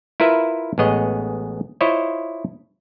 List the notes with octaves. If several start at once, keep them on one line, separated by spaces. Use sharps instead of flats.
E4 F4 A#4 B4 E5
A1 G#3 B3 G#4 C#5 D#5
E4 F4 C5 C#5 D#5